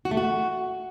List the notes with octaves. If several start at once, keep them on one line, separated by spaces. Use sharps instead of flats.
F#4
A3
F#4